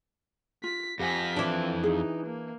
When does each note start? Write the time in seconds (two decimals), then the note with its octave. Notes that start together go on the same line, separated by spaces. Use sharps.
0.64 F4 B6
0.99 F2 F3 G4 F#5 G#5 A#6 B6
1.36 E3 C4 D4
1.83 D#4 G#4
2.26 A#3